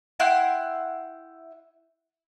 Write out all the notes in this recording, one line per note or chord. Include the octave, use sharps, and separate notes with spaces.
E4 F#5 G5 C6